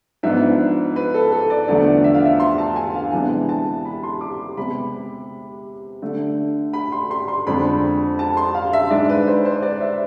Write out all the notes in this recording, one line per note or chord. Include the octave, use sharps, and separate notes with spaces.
G#2 F3 B3 D4 E5
B4
A4
A4
D5
E2 D3 F3 A3 D5
E5
F5
E5
C6
A5
G#5
F5
C3 E3 G#3 B3 D4 G#5
A5
B5
C6
D6
C3 G#3 B3 B5
D3 A3 D4
B5
C6
C6
C6
F2 D3 G#3 C4 B5
A5
C6
F5
E5
G#2 G#3 D4 D5
B4
C5
C5
D5
E5